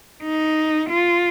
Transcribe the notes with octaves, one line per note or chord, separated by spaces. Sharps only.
D#4
F4